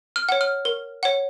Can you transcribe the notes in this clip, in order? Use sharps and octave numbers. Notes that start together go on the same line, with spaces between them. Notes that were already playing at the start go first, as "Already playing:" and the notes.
F6
C#5 F#5
F6
A#4
C#5 F#5